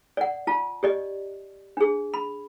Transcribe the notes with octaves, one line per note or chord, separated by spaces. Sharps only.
D5 F#5
F4 A5
G4 D5 D#5
D4 G#4
B5